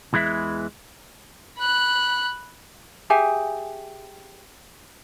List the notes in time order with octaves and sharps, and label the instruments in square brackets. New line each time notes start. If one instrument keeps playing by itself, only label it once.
[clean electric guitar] E2 E3 G#3 B4 E5
[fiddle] B5 F#6
[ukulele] G4 G#4 E5 G#5